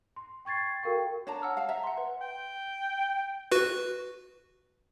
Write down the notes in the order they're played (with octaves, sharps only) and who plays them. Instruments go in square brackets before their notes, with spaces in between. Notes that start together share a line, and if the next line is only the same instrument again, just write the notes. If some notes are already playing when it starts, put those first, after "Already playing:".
[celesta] C6
G5 C#6 G#6 A6 C7
F#4 A4 A#4 F5 G5 C#6
[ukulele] D4 A5 A#5 [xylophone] C#5
[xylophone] F#5 E6 F6
[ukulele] F5 A5
E5 A#5
[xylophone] F#5 C6
B4
[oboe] G5
[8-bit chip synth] F#4 B4